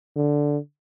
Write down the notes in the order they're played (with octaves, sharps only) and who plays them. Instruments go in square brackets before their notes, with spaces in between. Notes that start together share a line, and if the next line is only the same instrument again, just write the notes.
[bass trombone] D3